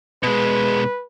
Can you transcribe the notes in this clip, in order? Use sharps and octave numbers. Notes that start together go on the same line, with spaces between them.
B2 G#3 B4